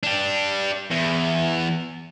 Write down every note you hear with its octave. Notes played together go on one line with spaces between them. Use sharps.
D4 G4
E2